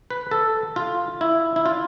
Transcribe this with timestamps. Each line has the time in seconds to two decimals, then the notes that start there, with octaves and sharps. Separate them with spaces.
0.10 B4
0.31 A4
0.76 F4
1.21 E4
1.56 E4
1.66 F4